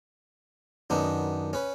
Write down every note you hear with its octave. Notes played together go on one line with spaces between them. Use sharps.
F#2 D#3 B3 D4 D#4
C#4 B4